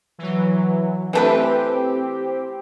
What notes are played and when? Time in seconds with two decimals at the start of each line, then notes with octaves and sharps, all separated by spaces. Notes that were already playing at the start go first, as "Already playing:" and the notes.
0.18 E3 F#3
1.13 E3 A3 C4 G4 B4